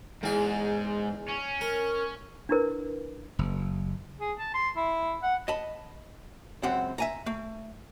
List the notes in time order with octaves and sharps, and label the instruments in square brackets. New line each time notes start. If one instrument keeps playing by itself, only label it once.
[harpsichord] E2 G#4 [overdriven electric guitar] G#2
[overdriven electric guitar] C#4
[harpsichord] A#4
[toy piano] D4 E4 A#4 B4
[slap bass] F#1
[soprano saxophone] G#4
A5
C6
E4
F#5
[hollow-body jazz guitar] D#5 A5 B5
C#2 F#2 C4 F#5
E5 G#5 A#5
A3